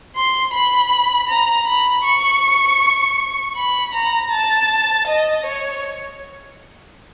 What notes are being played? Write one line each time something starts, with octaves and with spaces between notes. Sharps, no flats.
C6
B5
A#5
B5
C#6
B5
A#5
A5
D#5
C#5